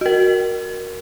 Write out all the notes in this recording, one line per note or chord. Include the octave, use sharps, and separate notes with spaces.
F#4 A#4